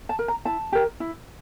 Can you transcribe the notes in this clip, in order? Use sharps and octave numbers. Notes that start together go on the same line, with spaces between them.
A5
A#4
A#5
E4 A5
G4 A#4
E4